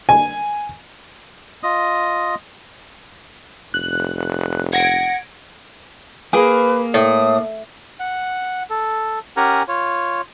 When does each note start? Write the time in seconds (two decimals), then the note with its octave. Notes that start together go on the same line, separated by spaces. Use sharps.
0.09 G#5
1.63 F4 D#5 D#6
3.74 F1 F#6
4.73 F#5 G#6 A#6 D7
6.33 A#3 G#4 B4
6.94 A2 D#6
8.00 F#5
8.70 A4
9.37 C#4 G4 A#4 F#5 G#5 A#5
9.68 F4 C#5